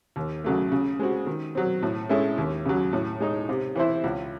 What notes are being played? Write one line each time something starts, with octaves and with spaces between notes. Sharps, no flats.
D#2
C#3 F#3 A3
C#3
G#3 C4 F#4
D#3
F#3 C4
A2
G#3 C#4 E4 A4
D#2
C#3 F#3
A2
G#3 D#4
C3
E3 C4 E4 C5
C#2